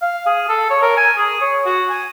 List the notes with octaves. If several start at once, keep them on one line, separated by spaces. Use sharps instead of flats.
F5
G#4
A4
C#5
A#4
G#5
G#4
C#5
F#4
G#5